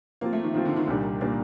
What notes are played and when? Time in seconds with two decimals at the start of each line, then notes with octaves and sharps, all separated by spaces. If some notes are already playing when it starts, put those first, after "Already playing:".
0.21 F3 A#3 C4 F4
0.33 A3
0.44 D#3
0.54 D#3 F3 C4 F4
0.66 D3
0.76 D#3
0.88 C2 A#2 G3 D4
1.21 A#2 G3 A#3 D4